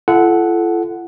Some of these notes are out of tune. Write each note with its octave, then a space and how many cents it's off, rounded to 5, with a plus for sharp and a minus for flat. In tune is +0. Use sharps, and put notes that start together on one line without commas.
F4 -45 A4 -20 F#5 +0